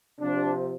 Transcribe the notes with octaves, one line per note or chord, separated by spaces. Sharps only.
C3 F3 D4